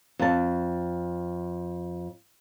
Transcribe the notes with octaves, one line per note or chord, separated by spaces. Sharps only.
F2 A5